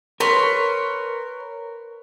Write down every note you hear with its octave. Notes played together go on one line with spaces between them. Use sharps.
A#4 B4 C#5 C6